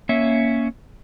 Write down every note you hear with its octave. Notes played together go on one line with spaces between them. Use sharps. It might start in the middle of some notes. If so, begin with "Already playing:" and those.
A#3 C#4 E5